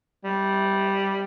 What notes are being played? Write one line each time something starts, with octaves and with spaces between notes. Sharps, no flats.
G3